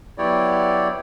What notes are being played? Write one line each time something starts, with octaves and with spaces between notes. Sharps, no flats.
F#3 B3 E4 G4 C#5 D5